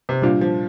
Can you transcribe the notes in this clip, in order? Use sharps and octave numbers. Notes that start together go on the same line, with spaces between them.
C3
A#2 G3 D4 F4
F3